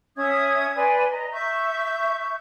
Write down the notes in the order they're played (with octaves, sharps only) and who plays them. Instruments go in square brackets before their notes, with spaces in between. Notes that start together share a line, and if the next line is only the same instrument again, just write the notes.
[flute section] C#4 E5 D#6 G#6
B4 D5 G#5 C6
D#5 A#5
E5 C#6 G6